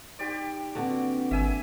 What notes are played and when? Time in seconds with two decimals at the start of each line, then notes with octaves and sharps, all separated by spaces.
0.19 D#4 G4 D5 C6 C#6
0.75 D3 A#3 C4 F#4 B4
1.31 G#1 E5 G#5 E6